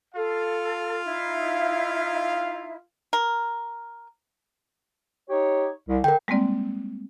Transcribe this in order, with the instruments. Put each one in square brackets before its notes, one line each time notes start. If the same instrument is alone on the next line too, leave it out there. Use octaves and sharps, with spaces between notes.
[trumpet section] F4 F5 [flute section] A4
[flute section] D#4 E4 E5
[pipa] A#4
[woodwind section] D#4 G4 C#5
C2
[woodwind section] D3 [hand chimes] A#4 G5
[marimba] G3 G#3 A#3 C4 D5